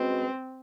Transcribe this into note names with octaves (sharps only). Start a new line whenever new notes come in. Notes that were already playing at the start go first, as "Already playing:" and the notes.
Already playing: G#3 C4 C#4 F#4 B4 D#5